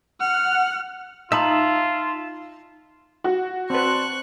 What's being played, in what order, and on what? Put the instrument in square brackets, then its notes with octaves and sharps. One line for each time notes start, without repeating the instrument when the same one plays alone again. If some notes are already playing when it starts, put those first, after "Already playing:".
[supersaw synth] F#5 [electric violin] F6
[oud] D#4 [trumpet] F4 [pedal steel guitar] E5 A5 B5
[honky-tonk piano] F#4
[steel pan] C4 B4 [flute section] D5 A5 C6 [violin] C#6 F#6